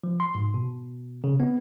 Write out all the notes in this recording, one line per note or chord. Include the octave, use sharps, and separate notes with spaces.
F3
C6
G#2
B2
C#3
B3